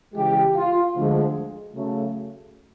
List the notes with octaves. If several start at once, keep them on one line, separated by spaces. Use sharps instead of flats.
C#3 E3 G#3 G4
F4
D2 D3 F3 G#3
C#3 F#3 A3